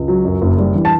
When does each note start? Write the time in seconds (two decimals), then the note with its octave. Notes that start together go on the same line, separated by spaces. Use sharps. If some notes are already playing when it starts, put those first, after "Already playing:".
Already playing: C#2
0.08 F#3
0.25 F#2
0.42 F#1
0.58 G3
0.76 E3
0.85 A5